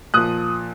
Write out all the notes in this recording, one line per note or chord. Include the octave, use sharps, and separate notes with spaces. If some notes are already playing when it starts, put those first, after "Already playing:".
A#2 F3 D#6 F#6